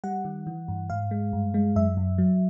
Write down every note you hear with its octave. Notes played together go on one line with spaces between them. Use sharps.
G3 F#5
D#3
E3
G2
G#2 F5
G#3
G2
G#3
F#2 E5
F#2
F#3